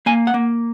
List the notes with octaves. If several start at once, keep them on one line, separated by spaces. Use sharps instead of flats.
A#3 G#5
F#5
A#3